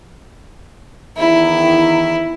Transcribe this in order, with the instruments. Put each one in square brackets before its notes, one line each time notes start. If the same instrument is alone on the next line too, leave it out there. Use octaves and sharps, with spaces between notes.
[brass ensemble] E2 D#3 [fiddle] E4